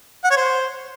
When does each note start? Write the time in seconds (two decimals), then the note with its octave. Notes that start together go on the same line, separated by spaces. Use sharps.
0.24 F#5
0.30 C#5
0.37 C5